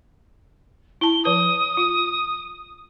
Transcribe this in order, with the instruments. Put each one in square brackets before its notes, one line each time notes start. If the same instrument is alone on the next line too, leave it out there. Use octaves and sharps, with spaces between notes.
[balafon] E4 A5 [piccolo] G7
[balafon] F3 B4 A5 [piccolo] D#6
[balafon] F4